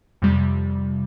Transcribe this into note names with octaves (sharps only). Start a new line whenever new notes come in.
F2 C3 G3